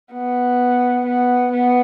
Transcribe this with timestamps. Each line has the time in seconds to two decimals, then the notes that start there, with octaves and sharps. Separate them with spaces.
0.14 B3
1.06 B3
1.53 B3